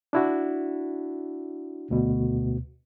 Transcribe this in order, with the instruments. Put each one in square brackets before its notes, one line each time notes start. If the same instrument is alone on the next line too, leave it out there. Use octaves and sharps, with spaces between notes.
[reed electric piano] D4 E4 F#4
[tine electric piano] D2 B2